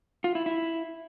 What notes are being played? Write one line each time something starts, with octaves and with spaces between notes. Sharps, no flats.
F4
E4
E4